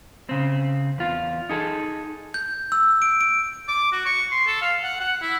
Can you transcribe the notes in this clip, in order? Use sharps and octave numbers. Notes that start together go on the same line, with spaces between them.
C#3 C4
E2 F4
D#4 G#4 A4
G6
E6
D7
D7
D6
F#4
C#6
C6
A4
F5
F#5
F#5
E4